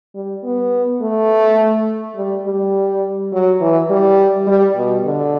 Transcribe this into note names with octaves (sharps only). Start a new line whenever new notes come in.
G3
B3
A3
G3
G3
F#3
E3
G3
G3
B2
D3